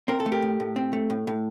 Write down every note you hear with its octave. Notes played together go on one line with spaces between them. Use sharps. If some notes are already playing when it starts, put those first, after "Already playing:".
C4 A#4
A4
A3
G4 A#4
A2
A2
C4
A3
A2
A2